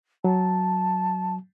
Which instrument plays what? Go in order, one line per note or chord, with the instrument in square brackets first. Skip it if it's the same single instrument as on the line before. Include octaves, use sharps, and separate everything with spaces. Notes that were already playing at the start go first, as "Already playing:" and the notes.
[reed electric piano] F#3 [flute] A5